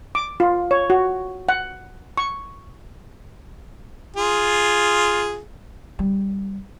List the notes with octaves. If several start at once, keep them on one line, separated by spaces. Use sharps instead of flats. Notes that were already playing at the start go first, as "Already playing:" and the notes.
D6
F4
C#5
F#4
F#5
C#6
F4 G#4
C#3 G3